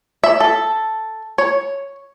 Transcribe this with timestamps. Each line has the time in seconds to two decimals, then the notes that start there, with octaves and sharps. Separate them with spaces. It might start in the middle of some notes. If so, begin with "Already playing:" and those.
0.24 E5
0.40 A4
1.38 C#5